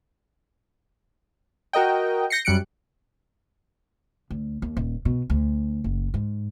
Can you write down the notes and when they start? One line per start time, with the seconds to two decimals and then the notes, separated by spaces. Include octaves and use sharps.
1.73 F#4 A#4 D#5 G5
2.30 G6 A#6 C7 C#7
2.45 F#2 G3 F#6 C#7 D7
4.30 D2
4.62 D#2
4.77 D#1
5.05 B2
5.30 D2
5.84 F#1
6.14 G#2